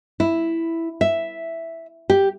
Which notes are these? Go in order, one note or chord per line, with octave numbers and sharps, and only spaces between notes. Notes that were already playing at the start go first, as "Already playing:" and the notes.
E4
E5
G4